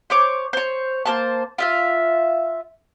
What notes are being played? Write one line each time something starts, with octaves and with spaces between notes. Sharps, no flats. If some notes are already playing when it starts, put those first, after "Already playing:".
C5 C#5 D6
C5 C#5
A#3 C5 A5
F4 E5 F5